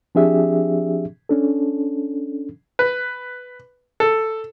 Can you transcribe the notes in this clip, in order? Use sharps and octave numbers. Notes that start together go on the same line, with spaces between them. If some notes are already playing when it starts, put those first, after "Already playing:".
F3 C4 D4 G4 G#4 E5
C#4 D4 A4
B4
A4